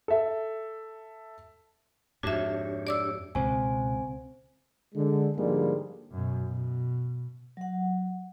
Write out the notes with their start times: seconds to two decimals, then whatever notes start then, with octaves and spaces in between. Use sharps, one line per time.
0.08 A4 E5
2.23 F2 G#2 D4 F#4 G4 C#5 E5
2.87 D5 D6 E6
3.35 C#2 B2 C4 C5 G#5
4.95 D3 G#3
5.37 G#2 D3 F3 G3 G#3 A#3
6.12 F#2 B2
6.46 B2
7.57 F#3 F#5